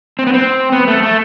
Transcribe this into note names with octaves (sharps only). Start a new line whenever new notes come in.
C4
B3
C4
B3
A3
A3